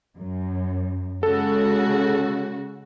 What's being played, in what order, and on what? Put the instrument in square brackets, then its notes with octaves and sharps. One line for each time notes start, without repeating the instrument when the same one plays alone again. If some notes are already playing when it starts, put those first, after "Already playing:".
[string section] F#2
[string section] C#3 G#3 F#4 [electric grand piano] A4